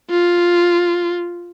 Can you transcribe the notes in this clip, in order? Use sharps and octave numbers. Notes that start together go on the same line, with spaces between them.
F4